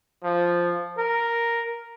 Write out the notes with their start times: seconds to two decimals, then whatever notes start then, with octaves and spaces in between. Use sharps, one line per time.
0.24 F3
0.98 A#4